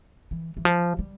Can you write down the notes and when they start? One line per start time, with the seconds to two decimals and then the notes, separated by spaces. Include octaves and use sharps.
0.31 E3
0.57 E3
0.65 F3
0.99 G3